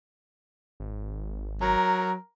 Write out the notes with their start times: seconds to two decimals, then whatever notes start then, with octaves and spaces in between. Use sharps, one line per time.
0.80 G#1
1.62 F#3 A#4